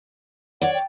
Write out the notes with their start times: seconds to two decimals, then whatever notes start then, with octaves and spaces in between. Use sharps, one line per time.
0.62 C#5 D5 F#5
0.74 G5